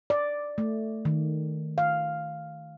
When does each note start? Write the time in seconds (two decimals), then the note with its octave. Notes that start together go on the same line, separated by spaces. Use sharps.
0.10 D5
0.58 A3
1.05 D#3
1.78 F5